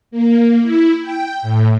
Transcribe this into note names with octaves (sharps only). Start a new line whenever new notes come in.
A#3
E4
G5
A2